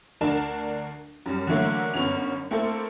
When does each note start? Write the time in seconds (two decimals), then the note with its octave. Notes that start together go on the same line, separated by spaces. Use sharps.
0.21 D2 D4 A#4 A5 E7
1.26 F#2 G3
1.47 D3 E3 F#3 A3 A#3
1.94 G1 F#2 B3 C#4 F7
2.51 A3 A#3 C4 E4 A4